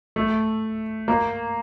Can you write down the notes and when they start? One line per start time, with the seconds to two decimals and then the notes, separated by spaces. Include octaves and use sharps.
0.16 A3
1.08 A#3